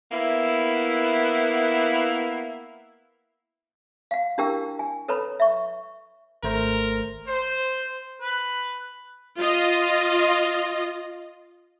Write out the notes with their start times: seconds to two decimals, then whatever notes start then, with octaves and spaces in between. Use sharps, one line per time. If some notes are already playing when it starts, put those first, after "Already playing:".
0.12 A#3 B3 E4
4.11 F5 F#5
4.38 D4 E4 G4 A#4 G5 E6
4.79 G#5
5.08 A4 B4 C#5 A#5 B5
5.40 E5 C#6
6.43 G#1 A3 A#4 C5
7.27 C5
8.21 B4
9.38 F4 D#5